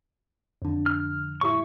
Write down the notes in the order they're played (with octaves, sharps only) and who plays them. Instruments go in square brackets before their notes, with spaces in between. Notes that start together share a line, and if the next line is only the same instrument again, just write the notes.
[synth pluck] F2 D3
[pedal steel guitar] F6
[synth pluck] A2 G3 E4 [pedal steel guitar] C#6